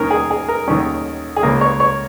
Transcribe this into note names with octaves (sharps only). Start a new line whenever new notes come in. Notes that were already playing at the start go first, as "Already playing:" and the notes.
Already playing: D#2 D#3 C#4 A#4
G#4
G#4
A#4
D#2 D#3 C#4
G#4
C#2 C#3 A#3 A#4
C#5
C#5